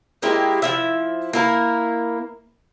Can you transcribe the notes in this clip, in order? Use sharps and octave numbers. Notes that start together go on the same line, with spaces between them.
G#3 A#3 E4 G4
F3 E4 E5
A#3 E4 A#4